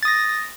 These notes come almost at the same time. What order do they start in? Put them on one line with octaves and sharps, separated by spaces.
A6 D#6 A#6